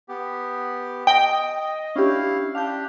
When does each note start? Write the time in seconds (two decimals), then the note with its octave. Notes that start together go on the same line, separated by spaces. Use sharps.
0.09 B3 G4
1.07 D#5 G5 D#6 A#6
1.96 C#4 D4 E4 G4 F5
2.55 D4 G4 F5 G6